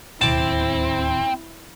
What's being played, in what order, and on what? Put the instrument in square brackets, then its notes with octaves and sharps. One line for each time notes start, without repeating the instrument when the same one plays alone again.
[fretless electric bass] D1 D#2 [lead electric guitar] C4 [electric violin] E4 [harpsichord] A5 D6